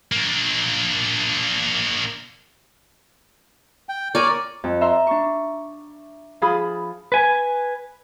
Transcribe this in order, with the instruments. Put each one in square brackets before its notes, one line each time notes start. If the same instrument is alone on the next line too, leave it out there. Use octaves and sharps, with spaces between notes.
[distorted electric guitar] A#3 D4
[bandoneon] G5
[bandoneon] A#4 C#5 [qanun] D5 G#5
[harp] F2
E5 A#5 C6
D4 C#6
F3 F4 G#4 B5 D#6
[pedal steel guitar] B4 G#5